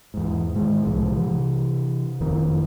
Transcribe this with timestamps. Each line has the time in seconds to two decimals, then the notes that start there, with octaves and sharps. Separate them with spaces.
0.14 E2 G#2
0.55 A2 D#3 G#3
0.86 C2 A2 C3 F3
1.10 C3 E3
2.20 F#1 F2 D#3